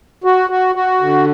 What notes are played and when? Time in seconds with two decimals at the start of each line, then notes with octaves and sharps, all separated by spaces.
0.24 F#4
0.50 F#4
0.75 F#4
1.01 D3